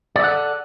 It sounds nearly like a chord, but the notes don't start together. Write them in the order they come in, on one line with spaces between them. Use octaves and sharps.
D5 E5 F#5 A4